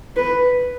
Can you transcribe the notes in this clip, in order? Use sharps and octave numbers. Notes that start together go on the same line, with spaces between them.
B4